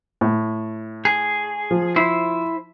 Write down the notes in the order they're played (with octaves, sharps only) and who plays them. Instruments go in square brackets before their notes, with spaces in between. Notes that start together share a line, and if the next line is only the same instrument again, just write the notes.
[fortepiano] A2
[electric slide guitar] G#4
[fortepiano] F3
[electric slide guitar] E4 C5